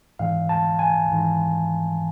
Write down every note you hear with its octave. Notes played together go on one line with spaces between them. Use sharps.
G#1 G#2 E3 F5
A5
G#5
G#1 G#2 E3